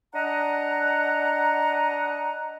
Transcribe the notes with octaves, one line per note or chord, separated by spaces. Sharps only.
D4 D#5 F#5 A#5